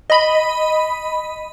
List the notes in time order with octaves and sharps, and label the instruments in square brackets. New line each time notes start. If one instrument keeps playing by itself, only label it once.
[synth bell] D#5 B5